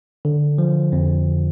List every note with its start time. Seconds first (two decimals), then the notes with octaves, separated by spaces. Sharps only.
0.25 D3
0.58 F3
0.92 F2